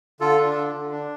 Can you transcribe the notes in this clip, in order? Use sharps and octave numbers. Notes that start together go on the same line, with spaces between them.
D3 F4 A4
D4
D3
D3
D4